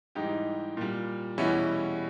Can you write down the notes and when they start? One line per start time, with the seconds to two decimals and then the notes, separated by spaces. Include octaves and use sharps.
0.15 G#2 E3 G3 D#4 G4
0.77 A#2 G3
1.38 E2 B2 G3 C#4 E4